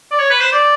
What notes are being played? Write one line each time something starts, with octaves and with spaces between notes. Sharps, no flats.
D5
C#5
B4
C5
D5